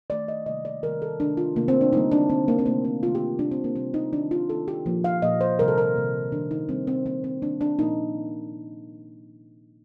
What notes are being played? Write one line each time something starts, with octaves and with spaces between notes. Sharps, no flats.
D#3 A3 D5
D#5
C3 D#3 G3 A#3 D#5
D5
C3 D#3 G3 A#3 A#4
A4
C3 D#3 A3 D4
F4
C3 D#3 A3 A#3
C4
D4
D3 G3 A#3 D#4
D4
D3 G3 A#3 C4
A#3
C4
C3 D#3 A3 A#3
C4
C3 D#3 A3 F4
G4
C3 G3 A#3 D4
C4
A#3
C3 G3 A#3 C4
D#4
D#3 A#3 D4
F4
D#3 A#3 A4
G4
A#2 F3 A#3
F5
A#2 F3 A#3 D#5
C5
C3 D#3 G3 A#3 A#4
A4
A#4
C3 D#3 G3 A#3
C3 D#3 G3 A#3 D4
D#4
C3 D#3 G3 A#3 C4
C4
D#3 G3 A#3 C4
C4
D#3 G3 A#3 D4
D4
A#2 F3 A#3 D#4